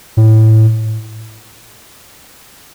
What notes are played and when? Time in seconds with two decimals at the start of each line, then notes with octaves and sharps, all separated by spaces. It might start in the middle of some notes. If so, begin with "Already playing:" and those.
0.17 A2